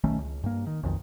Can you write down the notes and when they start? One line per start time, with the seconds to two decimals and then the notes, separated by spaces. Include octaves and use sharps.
0.04 B1 D#3 A3 C#4
0.18 C#2
0.44 G2 A#3
0.67 D#3
0.83 B1 F2 D#3